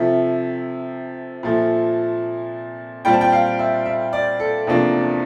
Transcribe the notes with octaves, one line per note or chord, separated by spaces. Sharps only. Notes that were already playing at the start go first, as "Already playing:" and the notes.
Already playing: C3 F3 A3 E5
A#2 F3 A3
A#2 G3 C4 F4 G5
A5
G5
F5
E5
E5
D5
A4
E2 C3 F3 A#3 D4